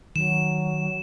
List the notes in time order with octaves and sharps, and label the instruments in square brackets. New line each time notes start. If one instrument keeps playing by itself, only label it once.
[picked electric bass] D#3 [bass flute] F#3 [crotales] E7